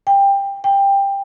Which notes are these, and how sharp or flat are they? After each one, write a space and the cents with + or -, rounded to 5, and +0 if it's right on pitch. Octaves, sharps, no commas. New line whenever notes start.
G5 +20
G5 +15